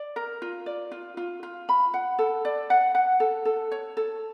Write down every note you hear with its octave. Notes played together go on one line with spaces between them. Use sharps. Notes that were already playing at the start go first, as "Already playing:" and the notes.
Already playing: D5
A#4
F4
D5
F4
F4
F4
B5
F#5
A4
D5
F#5
F#5
A4
A4
C#5
A4